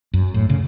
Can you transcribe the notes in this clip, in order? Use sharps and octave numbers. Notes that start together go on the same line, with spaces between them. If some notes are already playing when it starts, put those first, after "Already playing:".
F#2
A2
C#3